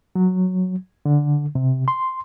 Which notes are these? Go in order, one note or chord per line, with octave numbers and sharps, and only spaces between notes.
F#3
D3
C3
C6